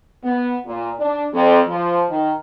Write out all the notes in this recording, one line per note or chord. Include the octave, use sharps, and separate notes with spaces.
B3
A#2
D4
F2
F3
D#3